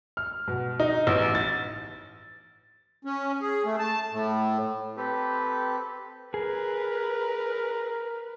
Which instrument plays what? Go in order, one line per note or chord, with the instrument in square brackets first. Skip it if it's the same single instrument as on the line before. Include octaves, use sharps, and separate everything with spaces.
[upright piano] F6
B2
D#4
A1
A6
[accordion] C#4
G#4
A3
A5
A2
[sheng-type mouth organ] C4 G4 A4 B4
[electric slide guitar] G#4 [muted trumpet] A#4 [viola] B4